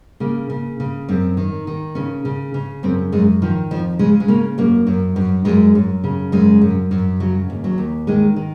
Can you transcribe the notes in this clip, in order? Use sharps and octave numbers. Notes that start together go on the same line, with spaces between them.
C#3 A#3
C#3
C#3
F#2 C4
D#3
D#3
C#3 C#4
C#3
C#3
F#2 C4
F#2 G#3
D#3 F3
F2 F3
C#3 G#3
G#3
C#3 A#3
F#2 A#3
F#2
F#2
F#2 G#3
F#2
C#3
F#2 G#3
F#2
F#2
C#3 F#3
D#2
F#3
D#2
D#3 G#3
D#3